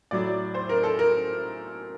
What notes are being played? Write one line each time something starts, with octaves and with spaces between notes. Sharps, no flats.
A2 F#3 D5
C5
A#4
A4
A#4